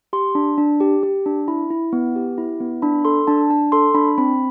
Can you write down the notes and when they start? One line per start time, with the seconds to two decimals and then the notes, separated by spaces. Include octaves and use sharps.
0.13 G4 C6
0.35 D4
0.58 D4
0.80 G4
1.03 G4
1.26 D4
1.48 E4 B5
1.71 E4
1.93 B3
2.15 G4
2.38 E4
2.60 B3
2.82 D4 B5
3.05 A4 C6
3.27 D4 A5
3.50 D4 A5
3.72 A4 C6
3.95 D4 B5
4.18 C4 B5